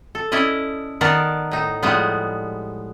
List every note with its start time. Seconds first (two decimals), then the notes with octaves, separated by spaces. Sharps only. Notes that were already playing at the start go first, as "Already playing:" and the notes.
0.15 A4
0.32 C#4 E4 D5 D#5
1.01 D#3 B3 A#4 D5 A5
1.51 A2 D#4
1.83 A2 F3 G3 G#3 B3